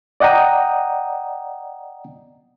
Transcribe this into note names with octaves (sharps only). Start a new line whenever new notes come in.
D5 D#5 F#5 G5 A#5 D#6